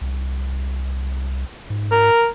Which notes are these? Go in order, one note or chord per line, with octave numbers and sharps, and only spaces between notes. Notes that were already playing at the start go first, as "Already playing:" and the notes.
C2
G#2
A#4